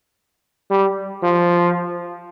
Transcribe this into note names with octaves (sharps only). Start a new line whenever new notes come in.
G3
F3